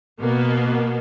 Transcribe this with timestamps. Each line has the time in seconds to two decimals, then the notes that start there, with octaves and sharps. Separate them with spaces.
0.21 B2 A#3 B3